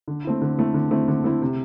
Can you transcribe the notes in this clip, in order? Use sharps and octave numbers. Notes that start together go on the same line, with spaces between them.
D3
A3 C4 E4
D3
A3 C4 E4
D3
A3 C4 E4
D3
A3 C4 E4
C3